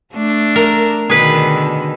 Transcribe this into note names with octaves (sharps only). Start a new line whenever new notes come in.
A3 D4
A#4
B2 D3 D#3 G#4 B4